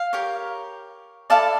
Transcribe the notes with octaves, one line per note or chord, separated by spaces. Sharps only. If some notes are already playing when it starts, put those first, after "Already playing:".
Already playing: F5
G4 A#4 C#5
E4 A4 D5 F5 A5